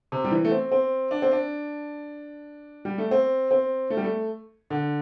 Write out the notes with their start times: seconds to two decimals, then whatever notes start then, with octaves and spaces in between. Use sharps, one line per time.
0.12 C3
0.24 G3
0.31 E3
0.45 A3
0.51 C4
0.72 C4
1.11 D4
1.22 C4
1.32 D4
2.85 G3
2.98 A3
3.11 C4
3.51 C4
3.90 A3
3.97 G3
4.04 A3
4.70 D3